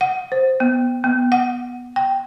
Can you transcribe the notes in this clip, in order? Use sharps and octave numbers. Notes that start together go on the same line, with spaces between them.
F#5
C5
B3
B3
F#5
G5